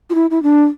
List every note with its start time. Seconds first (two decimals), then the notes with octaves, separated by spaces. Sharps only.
0.10 F4
0.15 E4
0.30 E4
0.43 D4